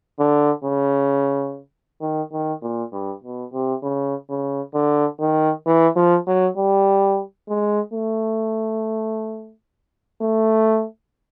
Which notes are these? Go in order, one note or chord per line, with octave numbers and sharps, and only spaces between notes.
D3
C#3
D#3
D#3
A#2
G2
B2
C3
C#3
C#3
D3
D#3
E3
F3
F#3
G3
G#3
A3
A3